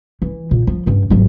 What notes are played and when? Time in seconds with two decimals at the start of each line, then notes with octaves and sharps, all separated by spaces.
0.22 E3
0.51 A#2
0.67 F3
0.86 G2 C#4
1.10 G#1 F#3